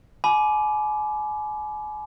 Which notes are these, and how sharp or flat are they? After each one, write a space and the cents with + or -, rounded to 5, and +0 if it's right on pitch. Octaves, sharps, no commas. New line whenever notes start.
G#5 +35 B5 +0 D6 +0